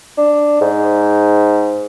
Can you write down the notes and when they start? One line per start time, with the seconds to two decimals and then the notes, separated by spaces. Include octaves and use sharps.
0.18 D4
0.61 G#2